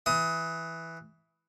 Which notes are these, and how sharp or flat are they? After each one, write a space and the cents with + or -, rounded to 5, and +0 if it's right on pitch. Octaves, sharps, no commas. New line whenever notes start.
E3 +0 D#6 +25